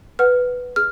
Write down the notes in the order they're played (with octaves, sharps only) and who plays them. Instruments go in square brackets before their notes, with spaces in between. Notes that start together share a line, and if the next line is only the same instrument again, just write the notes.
[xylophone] B4 F#5 F6
G#4 F6